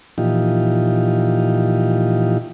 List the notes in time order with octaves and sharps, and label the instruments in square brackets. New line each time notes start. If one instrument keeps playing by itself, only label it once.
[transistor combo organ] A#2 E3 F3 D#4 F4 G4